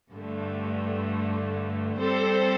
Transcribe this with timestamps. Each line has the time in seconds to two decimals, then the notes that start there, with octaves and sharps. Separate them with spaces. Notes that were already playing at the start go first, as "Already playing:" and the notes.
0.13 G2 D3 A3
1.99 G3 C4 A4 C5